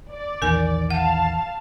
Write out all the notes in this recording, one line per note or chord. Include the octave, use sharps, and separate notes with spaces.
D5
A#1 E2 D#3 A#4 G#5
F5 F#5 A5